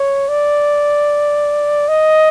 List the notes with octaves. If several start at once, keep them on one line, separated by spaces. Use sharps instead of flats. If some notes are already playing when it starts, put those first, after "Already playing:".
Already playing: C#5
D5
D#5